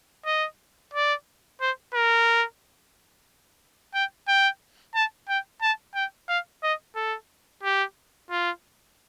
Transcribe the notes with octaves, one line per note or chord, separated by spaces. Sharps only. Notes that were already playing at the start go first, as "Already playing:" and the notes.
D#5
D5
C5
A#4
G5
G5
A5
G5
A5
G5
F5
D#5
A4
G4
F4